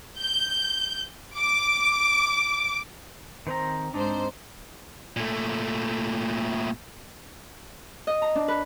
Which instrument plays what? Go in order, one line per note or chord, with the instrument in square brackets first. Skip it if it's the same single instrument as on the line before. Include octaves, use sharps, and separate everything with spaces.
[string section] G6
D6
[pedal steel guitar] D#3 C4 A#5 [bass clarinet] C5
[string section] G#2 C5 [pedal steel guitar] C4 D#4 [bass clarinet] D4
[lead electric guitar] A#2 A3
[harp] D#5
A#5
D4
B4